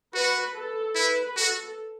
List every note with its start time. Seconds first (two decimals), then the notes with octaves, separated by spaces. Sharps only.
0.14 F#4 B4
0.55 A4
0.95 E4 B4
1.36 F#4 A4